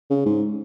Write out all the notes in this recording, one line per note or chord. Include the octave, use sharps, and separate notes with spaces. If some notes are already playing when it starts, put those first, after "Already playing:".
C#3
G#2